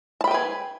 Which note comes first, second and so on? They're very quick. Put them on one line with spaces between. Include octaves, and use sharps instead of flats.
A5 B5 G5 B4 G#4